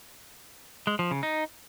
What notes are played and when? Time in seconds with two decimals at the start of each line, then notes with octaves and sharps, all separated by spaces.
0.87 G#3
0.99 F3
1.11 C#3
1.23 D#4